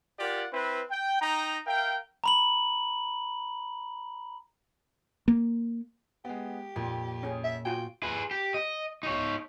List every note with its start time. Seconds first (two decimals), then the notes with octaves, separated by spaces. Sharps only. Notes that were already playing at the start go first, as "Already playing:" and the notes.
0.19 F4 G4 A#4 D5 F#5
0.53 C4 E4 B4
0.91 G5
1.21 D#4 G5 A#5
1.67 A#4 E5 F5 G5
2.24 A#5 B5 F#7
5.28 A#3
6.25 G#3 B3 G4
6.76 F2 A#2
7.23 C#4 G#4
7.44 E5
7.65 F4 F#4 G5 G#5
8.03 G#4 B4
8.31 G4
8.54 D#5
9.03 D#4 C#5